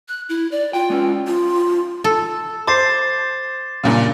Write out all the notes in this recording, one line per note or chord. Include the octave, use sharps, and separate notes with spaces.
F#6
E4
D5
F4 G5
G#3 C#4
F4
A4
C5 D6 A6 C7
G2 A#2 C#3